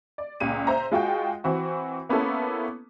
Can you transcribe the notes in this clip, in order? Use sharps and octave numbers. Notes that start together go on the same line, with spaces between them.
D5
C#2 A#2 D#7
C5 E5 A#5
G#3 F4 F#4 G5
E3 C4 F#4
A#3 B3 C#4 E4 A4